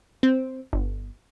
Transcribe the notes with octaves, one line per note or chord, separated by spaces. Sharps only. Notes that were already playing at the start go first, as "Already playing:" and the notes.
C4
G1